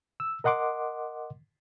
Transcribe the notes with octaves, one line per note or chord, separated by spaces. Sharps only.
E6
A#4 D#5 F#5 C6 D6